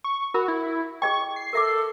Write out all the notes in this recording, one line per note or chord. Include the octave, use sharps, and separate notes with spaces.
C#6
F#4 A#4 B5
E4
G#4 D#5 G5 C#6
C7
A4 A#4 E5 D6